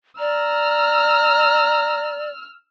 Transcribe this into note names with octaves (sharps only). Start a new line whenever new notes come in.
D5 A#5 E6 F6